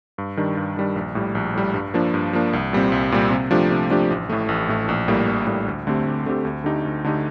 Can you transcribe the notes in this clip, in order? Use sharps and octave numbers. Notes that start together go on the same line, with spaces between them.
G2
D#3 G3 D4
G2
D#3 G3 D4
A#1
A2 G3
A#1
A2 G3
G2
F3 A#3 D4
G2
F3 A#3 D4
C2
A#2 G3 C4
C2
A#2 G3 C4
C3
F3 A3 D4 G4
C3
F3 A3 D4 G4
A1
A2 A3
A1
A2 A3
A#1
A2 G3 A#3
A#1
A2 G3 A#3
D2
D3 A3 C4 G4
D2
D3 A3 C4 G4
D2
D3 A3 D#4 G4
D2
D3 A3 D#4 G4